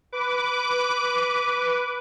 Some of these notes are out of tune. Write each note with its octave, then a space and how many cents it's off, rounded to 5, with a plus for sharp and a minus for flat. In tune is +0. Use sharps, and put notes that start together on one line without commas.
B4 +0 D6 -15